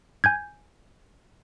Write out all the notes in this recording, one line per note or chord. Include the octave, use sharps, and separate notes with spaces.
G#5 G6 G#6